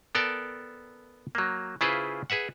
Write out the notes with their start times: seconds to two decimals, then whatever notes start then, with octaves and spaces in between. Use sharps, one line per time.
0.15 B3 A4 A#4 D5 G5 A5
1.35 F#3 A#3
1.81 C#3 E4 F4 G#4 B4 C5
2.30 G#4 B4 E5 F#5